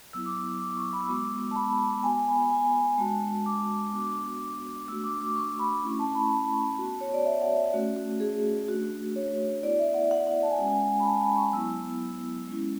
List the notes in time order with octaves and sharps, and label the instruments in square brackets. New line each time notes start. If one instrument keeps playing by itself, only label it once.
[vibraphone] F#3 B3 E4 E6
D6
E6
D6
C#6
B5
E6
G#3 B3 F#4 D6
A5
B5
B3 F#4 G#5
B5
G#5
G#3 D4 F#4 A5
D6
B3 D4 F#4 D6
A3 D4 F#4 E6
D6
D6
C#6
B5
A3 C#4 E4 C#6
A5
B5
A5
B3 F#4
C#5
D5
E5
F#5
E5
A3 C#4 F#4
F#4
G#4
A3 D4 F#4
C#5
B3 E4 D5
E5
F#5
F#5
F#5
A5
G#5
G#3 C#4 F#4 F#5
G#5
B5
A5
B5
C#6
F#3 B3 E4 E6
G#3 C#4 E4